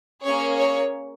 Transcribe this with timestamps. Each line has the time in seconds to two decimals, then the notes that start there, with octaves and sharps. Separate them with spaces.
0.23 A#3 C#4 G#4 C#5
0.56 C#5